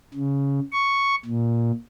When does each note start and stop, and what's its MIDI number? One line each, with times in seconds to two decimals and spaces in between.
0.14 0.60 49
0.73 1.15 85
1.25 1.72 46